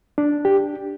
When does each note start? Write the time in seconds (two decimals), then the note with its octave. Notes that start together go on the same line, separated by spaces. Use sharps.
0.18 D4
0.45 G4